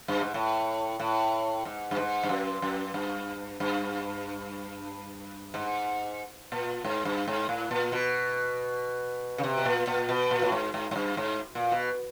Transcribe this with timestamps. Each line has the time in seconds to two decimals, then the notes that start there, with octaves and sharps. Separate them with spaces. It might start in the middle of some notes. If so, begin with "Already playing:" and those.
0.08 G2
0.21 G#2
0.34 A2
1.00 A2
1.65 G#2
1.91 G2
1.97 G#2
2.23 G2
2.29 F#2
2.62 F#2
2.94 G2
3.60 G2
5.54 G#2
6.52 A#2
6.85 G#2
7.05 G2
7.28 G#2
7.49 A2
7.71 A#2
7.92 B2
9.38 C#3
9.44 C3
9.58 B2
9.66 A#2
9.87 A#2
10.09 B2
10.31 A#2
10.42 A2
10.52 G#2
10.74 G#2
10.91 G#2
10.96 G2
11.17 G#2
11.55 A#2
11.72 B2